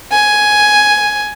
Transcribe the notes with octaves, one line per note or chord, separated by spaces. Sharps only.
G#5